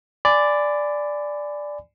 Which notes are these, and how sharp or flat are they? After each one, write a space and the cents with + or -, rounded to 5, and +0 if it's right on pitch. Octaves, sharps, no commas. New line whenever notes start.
D5 +0 G#5 +0 B5 +30